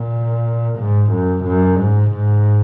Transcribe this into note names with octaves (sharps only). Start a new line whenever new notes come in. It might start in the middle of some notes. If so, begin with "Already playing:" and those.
Already playing: A#2
G#2
F#2
F#2
G#2
G#2